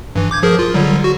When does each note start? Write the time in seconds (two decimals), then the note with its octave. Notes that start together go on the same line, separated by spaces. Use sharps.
0.16 G2 E3
0.31 D6 G6 G#6
0.43 F3 G#4 A#4
0.59 F4
0.74 D3 F#3 G3
1.04 F#4